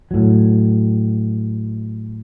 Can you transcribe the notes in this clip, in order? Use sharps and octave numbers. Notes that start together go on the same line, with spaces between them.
A2 F#3